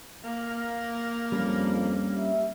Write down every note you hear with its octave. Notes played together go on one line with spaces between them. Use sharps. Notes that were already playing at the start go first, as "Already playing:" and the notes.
A#3
F2 G3 C#4 D4
E5